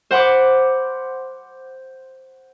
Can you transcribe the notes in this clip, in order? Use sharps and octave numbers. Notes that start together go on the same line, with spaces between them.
C5 F#5 B5 C6 D6